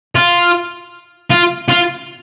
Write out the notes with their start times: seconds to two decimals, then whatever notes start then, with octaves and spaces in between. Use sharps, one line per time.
0.15 F4
1.30 F4
1.69 F4